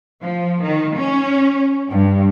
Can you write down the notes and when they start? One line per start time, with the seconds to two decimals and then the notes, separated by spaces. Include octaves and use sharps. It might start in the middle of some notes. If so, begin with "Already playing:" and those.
0.22 F3
0.63 D#3
0.97 C#4
1.90 G2